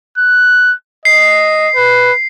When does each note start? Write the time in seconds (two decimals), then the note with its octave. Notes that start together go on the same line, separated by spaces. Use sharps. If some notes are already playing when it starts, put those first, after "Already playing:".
0.18 F#6
1.05 D#5 C7
1.76 B4